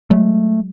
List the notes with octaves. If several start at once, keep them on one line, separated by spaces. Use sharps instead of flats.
F#3 G#3 A3